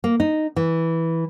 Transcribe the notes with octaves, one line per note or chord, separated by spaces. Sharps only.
A#3
D#4
E3